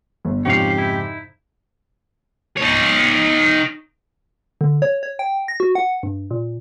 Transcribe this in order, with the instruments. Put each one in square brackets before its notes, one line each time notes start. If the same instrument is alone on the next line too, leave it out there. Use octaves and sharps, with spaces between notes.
[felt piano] G1
[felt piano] F2 G#2 C#3 [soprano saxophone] G4 [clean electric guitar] C#5 D5 F5
[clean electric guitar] D#4 E4
[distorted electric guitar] D#4 C#5
[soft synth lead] D3
C#5
C#5
G5
A#6
F#4
F#5
G2
A#2